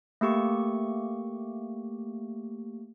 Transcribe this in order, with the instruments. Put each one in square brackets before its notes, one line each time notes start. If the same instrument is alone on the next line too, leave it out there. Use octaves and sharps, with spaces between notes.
[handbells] A3 A#3 G4 C#6